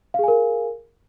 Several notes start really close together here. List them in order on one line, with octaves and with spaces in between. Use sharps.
F5 G#4 G#5 A#4